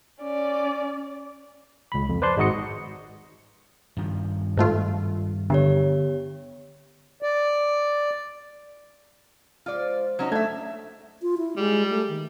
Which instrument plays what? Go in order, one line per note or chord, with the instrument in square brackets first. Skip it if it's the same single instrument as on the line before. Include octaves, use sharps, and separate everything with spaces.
[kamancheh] C#4 D5
[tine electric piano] C#2 B5
F2
B4 C5 D5 A5 C6 F#6
G#1 G#3 D#4 F#4 D#5 C#7
[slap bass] G2 D#3 F3
[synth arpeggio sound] G#2 A3 F4
[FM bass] D3 [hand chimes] B3 G4 C#5
[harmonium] D5
[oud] F3 G#3 [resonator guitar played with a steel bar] F4 D5
[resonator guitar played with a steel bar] F#3 C#4 D#4
[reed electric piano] A3 G#6 [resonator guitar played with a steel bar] D4 E5
[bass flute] F4
E4
[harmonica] G3 [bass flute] G#3
[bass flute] A3
D#3